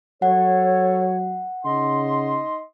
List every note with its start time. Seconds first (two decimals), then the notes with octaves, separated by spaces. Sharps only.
0.22 F#3 A4 C#5 F#5
1.65 C#3 D#4 D#5 C6